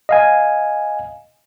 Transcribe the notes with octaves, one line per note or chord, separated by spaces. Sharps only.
D#5 F5 G#5